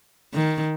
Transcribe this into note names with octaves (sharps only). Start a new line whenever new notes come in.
D#3